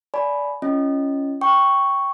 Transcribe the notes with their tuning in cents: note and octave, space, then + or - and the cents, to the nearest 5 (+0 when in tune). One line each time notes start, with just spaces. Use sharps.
D5 -20 G#5 +30 B5 +0
C#4 +0 F4 -40 D#5 +0
G5 +0 C#6 +0